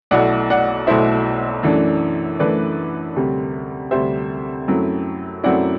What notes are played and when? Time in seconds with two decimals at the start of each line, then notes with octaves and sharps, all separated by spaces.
0.11 B1 B2 A3 E4 D5 F#5
0.50 D5 F#5
0.87 B1 B2 A3 E4 C5 E5
1.63 F#2 E3 A3 D4
2.39 F#2 E3 A3 D4 B4 D5
3.16 D2 C3 G3
3.91 D2 C3 G3 C5 E5
4.68 F#2 F#3 A3 C4 E4
5.44 F#2 F#3 A3 C4 E4 D5 F#5